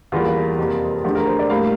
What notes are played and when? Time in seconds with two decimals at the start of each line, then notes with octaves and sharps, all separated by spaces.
0.12 E2 E3 G3 A#3 F4
0.59 F2 C3 G3 A#3
1.04 E2 D3 F3 A3 G4
1.15 A#4
1.27 C5
1.39 D5
1.50 A2 G3 A#3 F5